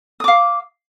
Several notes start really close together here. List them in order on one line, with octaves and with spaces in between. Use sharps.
D#6 D6 F5